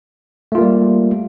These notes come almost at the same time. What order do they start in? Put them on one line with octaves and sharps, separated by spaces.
A3 F4 A#3 G3